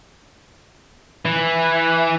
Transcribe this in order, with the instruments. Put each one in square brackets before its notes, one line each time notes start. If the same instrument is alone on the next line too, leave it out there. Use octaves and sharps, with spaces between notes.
[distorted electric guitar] E3